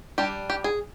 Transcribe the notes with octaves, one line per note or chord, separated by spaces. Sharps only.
G3 D4 G4
G4
G#4